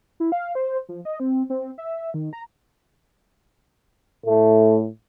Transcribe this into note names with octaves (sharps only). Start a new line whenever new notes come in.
E4
F5
C5
F3
D#5
C4
C4
E5
D#3
A#5
A2 A3